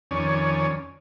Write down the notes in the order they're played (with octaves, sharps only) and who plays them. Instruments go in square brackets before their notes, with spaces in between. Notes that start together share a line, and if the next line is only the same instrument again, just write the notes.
[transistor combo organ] F2 D#3 C#4 C#5 D5 G#5